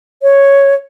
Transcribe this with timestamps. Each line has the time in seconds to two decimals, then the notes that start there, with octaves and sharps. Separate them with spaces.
0.22 C#5